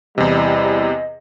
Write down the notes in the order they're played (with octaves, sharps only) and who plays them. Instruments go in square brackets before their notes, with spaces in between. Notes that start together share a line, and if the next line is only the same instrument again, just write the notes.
[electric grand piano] E2 C3 [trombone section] E3 G3 [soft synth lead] D#5